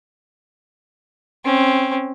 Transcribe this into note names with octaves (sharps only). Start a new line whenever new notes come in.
C4 C#4